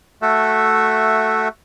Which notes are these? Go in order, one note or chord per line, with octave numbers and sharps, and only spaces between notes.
A3 F#4 A4 E5